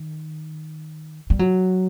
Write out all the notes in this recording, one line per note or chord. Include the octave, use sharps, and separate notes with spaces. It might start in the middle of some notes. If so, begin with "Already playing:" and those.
Already playing: D#3
G3
F#3